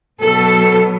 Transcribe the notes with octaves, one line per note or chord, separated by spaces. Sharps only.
B2 F#3 B3 A4